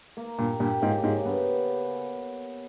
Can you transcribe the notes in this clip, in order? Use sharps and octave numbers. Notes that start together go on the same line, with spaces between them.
A#3
G2 A#2 G4
G2 A#2 G4
G#2 C#3
G#2 C#3
G2 B3